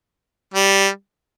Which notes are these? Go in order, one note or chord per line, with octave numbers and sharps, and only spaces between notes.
G3